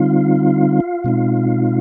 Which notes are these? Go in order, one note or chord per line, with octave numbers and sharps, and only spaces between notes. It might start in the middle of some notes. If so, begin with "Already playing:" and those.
Already playing: D3 G3 C4 D#4 F4 F5
B2 G#3 C4 D#4